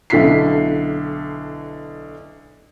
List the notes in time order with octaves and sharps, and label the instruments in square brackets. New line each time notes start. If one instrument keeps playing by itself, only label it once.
[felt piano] B1 D3 E4 B6 C7